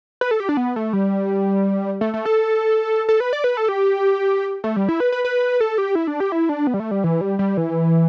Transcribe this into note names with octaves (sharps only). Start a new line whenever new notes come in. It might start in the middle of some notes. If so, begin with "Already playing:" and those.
B4
A4
G4
D4
B3
A3
G3
A3
A3
A4
A4
B4
D5
B4
A4
G4
A3
G3
E4
B4
B4
B4
A4
G4
E4
D4
G4
E4
D4
B3
G3
A3
G3
E3
G3
G3
E3